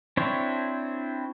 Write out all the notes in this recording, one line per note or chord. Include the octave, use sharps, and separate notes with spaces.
C4 D4 E4 C5 C#5